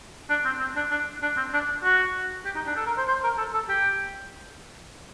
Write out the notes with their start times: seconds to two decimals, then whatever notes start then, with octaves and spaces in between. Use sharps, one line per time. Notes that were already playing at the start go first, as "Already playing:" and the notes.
0.30 D4
0.45 C4
0.60 C4
0.76 D4
0.91 D4
1.22 D4
1.37 C4
1.54 D4
1.84 F#4
2.45 G4
2.55 D#4
2.67 D4
2.76 A4
2.86 A#4
2.97 C5
3.08 C5
3.24 A#4
3.38 A4
3.54 A4
3.69 G4